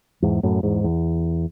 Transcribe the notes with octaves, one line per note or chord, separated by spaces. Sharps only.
E2 G#2
F#2 A2
E2 G#2
E2